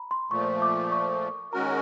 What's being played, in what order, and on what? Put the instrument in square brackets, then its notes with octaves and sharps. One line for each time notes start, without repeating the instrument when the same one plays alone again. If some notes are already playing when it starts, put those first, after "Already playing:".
Already playing: [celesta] A#5 B5
C6
[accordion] A#2 F3 A3 [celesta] C#6
[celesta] D6
C#6
[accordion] D#3 G#3 C#4 F#4 A#4 [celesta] A#5